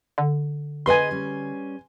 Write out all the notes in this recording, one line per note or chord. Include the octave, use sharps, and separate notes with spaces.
D3
G#4 B4 D#5 G#5 C6
G3 C#4